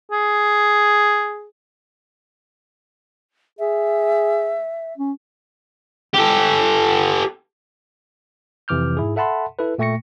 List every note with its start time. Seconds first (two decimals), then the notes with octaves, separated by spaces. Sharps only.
0.12 G#4
3.59 G#4 E5
4.98 C#4
6.14 G4 A4
8.68 F2 C3 E3 D6 F6 G6
8.97 G#2 E4 G#4
9.16 A4 E5 F#5 A5 B5 C6
9.59 E4 A4 B4
9.78 A#2 A3 G5 C#6 A#6 C#7